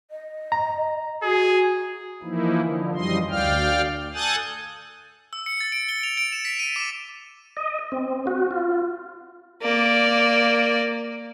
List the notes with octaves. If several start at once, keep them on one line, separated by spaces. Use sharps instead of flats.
D#5
A#5
F#4 G#4
E3 F3 A#3 D#4 E4
D3 F3
F#2 E3 F3 G3 D#5 C6
D2 D5 F5 G5 F6
A4 G#5 D#6 F#6 G6 A6
E6
C#7
A6
D7
G7
F7
D7
E7
B6
D#7
D6
D#5
C4
F#4
F4
A#3 D5